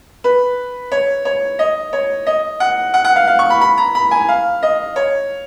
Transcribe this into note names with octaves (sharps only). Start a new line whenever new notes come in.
B4
C#5
C#5
D#5
C#5
D#5
F#5
F#5
F#5
F5
F5
C#6
B5
B5
A#5
B5
G#5
F5
D#5
C#5